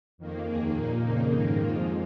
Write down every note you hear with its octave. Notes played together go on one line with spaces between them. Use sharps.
F2 D#3 A#3
D#2 D#3 A#3 G#4
A#2 A#3 D#4
F2 C#3 A#3 D#4
G#2 D#3 A#3 D#4
F2 F3 G#3 F4